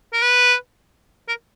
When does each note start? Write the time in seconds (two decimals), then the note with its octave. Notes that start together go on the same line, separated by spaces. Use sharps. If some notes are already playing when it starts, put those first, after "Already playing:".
0.13 A#4
0.23 B4
1.28 A#4